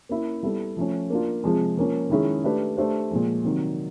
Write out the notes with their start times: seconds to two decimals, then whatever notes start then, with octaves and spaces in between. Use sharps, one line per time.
0.09 A#3 C#4 E4
0.43 G3 B3 E4 A4
0.77 F3 A3 C#4
1.10 A#3 D4 F4
1.44 C3 F3 G#3
1.77 F3 A#3 C#4
2.10 D#3 G#3 C#4 E4 G#4
2.44 A3 D4 G4 B4
2.77 A3 D4 G4 C5
3.11 A#2 F3 G#3
3.44 C3 D#3 F#3